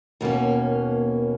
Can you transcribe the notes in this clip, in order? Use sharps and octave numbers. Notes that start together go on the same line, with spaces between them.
D#2 B2 A#3 C#4